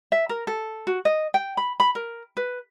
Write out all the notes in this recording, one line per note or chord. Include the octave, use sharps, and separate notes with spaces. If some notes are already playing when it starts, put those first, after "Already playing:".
E5
A#4
A4
F#4
D#5
G5
B5
B5
A#4
B4